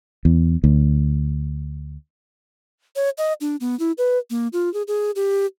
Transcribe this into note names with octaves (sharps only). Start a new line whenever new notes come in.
E2
D2
C#5
D#5
D4
B3
E4
B4
A#3
F4
G#4
G#4
G4